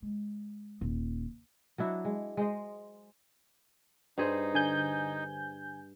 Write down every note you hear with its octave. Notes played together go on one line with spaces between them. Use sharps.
G#3
D#1
F#3 D4 E4 F#4
G#3
G#3 C5 D#5
G2 D#4 G#4 C5
D3 G#5 G6